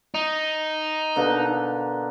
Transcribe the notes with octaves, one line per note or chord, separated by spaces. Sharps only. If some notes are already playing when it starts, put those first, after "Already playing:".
D#4
B2 D3 A#3